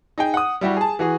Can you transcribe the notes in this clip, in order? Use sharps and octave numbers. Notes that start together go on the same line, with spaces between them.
D#4 G#4 G5
F#5 D#6
G3 E4 F#4 G4
G#4 A5
E3 F#4 G#4